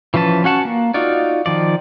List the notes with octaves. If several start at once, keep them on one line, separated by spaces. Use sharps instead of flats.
E3 F3 C#4 B4 A5
C#4 F#4 F#5 A5
A#3
D#4 F4 F#4 D5
D#3 F3 D5